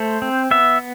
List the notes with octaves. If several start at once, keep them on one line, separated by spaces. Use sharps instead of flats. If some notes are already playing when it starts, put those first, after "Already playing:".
Already playing: A3 C5
C4
B3 E5